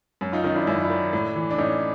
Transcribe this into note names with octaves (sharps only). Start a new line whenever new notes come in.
F#2
D#4 F4
D#3 C#4 D#4
D4 E4
F#2 E4
D#4
D4 E4
D#3
A2
E3
D4
A2 C#4 D#4